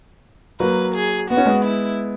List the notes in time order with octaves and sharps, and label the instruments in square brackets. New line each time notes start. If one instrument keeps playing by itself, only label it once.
[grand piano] F#3 A#3 [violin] B4
[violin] G#4
[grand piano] B3 [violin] F#4
[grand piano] C#4
G#3 B3
[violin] E4